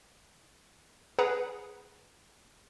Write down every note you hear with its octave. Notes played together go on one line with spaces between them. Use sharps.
G#4 B4 F#5 A#5